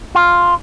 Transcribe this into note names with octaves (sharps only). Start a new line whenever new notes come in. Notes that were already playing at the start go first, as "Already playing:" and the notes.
F4